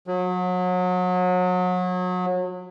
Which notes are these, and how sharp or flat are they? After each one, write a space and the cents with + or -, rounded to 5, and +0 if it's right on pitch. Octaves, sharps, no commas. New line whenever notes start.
F#3 -30